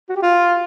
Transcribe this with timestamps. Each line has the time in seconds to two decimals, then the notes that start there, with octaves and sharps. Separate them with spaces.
0.09 F#4
0.16 G4
0.22 F4